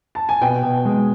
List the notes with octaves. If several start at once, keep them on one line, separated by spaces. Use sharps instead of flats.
A5
G#5
B2 G5
B2
G#3